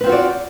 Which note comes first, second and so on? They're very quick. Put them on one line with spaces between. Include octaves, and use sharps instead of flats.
B4 C4 F4 F#4 D5